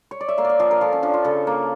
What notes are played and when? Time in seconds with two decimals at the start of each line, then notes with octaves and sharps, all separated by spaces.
0.11 C#5
0.21 D5
0.28 E5
0.38 A#3 F5
0.44 D5 E5
0.59 F3 F5
0.71 A#4
0.81 F3 A4
0.92 C#4
1.03 F3 D4
1.14 F4
1.25 C#3 A4
1.47 A#3